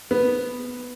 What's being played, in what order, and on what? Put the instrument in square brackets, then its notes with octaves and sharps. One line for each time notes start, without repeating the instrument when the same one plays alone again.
[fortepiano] B3